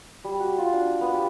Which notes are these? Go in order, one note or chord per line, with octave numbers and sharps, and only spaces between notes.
G3
F#4
F4
D4
B3
G4